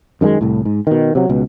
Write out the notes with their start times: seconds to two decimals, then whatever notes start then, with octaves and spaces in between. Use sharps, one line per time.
0.21 F#2 D#3 E3 G#3
0.41 C2 A2
0.65 G#2
0.87 B2 D#3
1.15 C3 F#3
1.29 C#2 B2